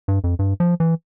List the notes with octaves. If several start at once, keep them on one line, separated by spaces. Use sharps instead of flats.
G2
F2
G2
F3
E3